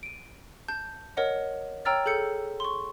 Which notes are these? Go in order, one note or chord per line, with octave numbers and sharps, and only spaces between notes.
D7 D#7
A5 G6
A#4 C#5 D#5 F#5
C#5 G5 A#5 E6 F6 A6
G#4 A4 G6 C#7
C6 C#6